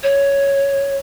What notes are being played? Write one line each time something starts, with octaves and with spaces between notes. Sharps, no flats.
C#5